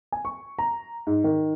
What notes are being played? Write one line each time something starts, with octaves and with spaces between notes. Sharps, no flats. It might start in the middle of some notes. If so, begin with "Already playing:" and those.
G#5
C#6
A#5
G#2
D#3